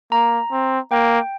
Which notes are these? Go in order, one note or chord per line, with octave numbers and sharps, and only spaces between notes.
A#3 A#5
C4
A#3 G5